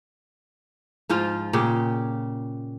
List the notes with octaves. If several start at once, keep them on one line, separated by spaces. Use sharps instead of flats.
G#2 F3 F4
A#2 C#3 G4